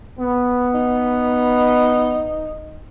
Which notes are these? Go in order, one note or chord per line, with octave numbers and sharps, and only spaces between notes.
B3
D#4